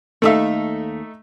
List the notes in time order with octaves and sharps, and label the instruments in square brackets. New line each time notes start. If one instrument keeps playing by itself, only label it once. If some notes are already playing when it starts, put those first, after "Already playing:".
[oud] D#2 A4 F5 [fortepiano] A3 D#4 E5